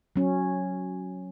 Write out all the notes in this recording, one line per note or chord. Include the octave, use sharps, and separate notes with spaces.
F#3 C#4